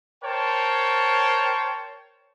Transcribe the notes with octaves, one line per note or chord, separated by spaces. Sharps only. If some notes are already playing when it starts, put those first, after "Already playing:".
A#4 C5 C#5 G5 A5